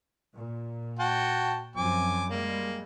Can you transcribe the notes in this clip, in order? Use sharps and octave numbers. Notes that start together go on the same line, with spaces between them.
A#2
F#4 G5 A5
F#2 F3 C4 G#5 D6
G3 G#3 A#3